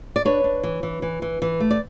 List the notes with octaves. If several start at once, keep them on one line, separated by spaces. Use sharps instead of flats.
D5
D4 B4 C#5
D4
E3
E3
E3
E3
E3
A3
D5